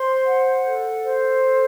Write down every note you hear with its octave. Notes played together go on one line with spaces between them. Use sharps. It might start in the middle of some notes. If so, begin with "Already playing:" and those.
Already playing: C5 C6
F#5
A4
C5
A4